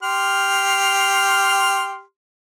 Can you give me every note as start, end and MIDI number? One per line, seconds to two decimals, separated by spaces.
0.03 2.02 67
0.03 2.02 84
0.03 2.02 89